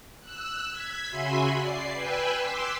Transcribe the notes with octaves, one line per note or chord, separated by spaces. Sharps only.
E6 F#6
G#6 B6
C#3 F#4 E5 G#5 B5 C6
D5 C7
B4 G5 G#5 E6 F#6
C6 D6 E6 B6